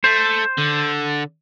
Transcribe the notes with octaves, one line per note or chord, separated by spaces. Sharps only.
A3 C5
D3